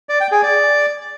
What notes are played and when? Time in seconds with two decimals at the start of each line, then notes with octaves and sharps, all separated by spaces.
0.09 D5
0.20 G5
0.32 G#4
0.43 D5